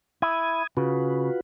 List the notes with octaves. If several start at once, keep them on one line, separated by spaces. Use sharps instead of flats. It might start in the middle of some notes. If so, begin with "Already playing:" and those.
E4 D#6 G#6
C#3 F4 F#4 B4